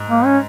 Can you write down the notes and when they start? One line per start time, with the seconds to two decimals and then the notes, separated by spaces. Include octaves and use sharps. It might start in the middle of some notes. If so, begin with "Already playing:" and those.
Already playing: G#2
0.08 A#3
0.25 C#4